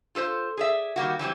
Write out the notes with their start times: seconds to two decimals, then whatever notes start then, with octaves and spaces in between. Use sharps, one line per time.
0.15 F4 A4 B4 C5
0.57 G#4 D5 E5
0.96 D#3 G3 A#3 F#4
1.19 E3 F#3 G3 C4